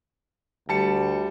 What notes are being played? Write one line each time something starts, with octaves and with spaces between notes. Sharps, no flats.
D2 G3 A5 C#7